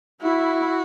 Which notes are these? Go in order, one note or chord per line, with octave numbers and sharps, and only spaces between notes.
E4 F#4